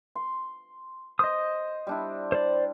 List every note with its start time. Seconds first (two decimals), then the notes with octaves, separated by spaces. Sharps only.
0.15 C6
1.19 C5 D#5 D#6
1.87 G3 D4 E4
2.32 C5 D5